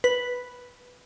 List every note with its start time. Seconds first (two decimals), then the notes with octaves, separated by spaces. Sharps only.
0.04 B4